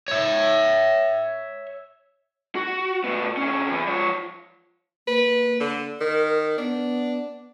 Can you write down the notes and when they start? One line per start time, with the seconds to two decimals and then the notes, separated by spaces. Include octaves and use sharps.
0.08 C#5 E5
2.56 F#4
3.04 A2 B3
3.37 C3 C#4
3.71 E2
3.88 F3 C#5
5.08 A#3 B4
5.60 D3
6.00 D#3 A#4
6.58 B3 D4